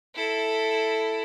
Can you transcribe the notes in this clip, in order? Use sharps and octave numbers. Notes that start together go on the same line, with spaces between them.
E4 A4